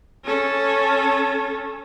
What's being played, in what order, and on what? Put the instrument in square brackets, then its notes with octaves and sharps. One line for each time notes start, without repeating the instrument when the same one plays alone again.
[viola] C#4 A4